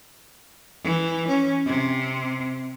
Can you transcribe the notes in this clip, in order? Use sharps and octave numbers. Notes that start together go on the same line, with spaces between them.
E3
C#4
C3